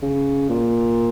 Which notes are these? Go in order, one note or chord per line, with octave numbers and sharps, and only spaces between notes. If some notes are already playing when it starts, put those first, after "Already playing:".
C#3
A#2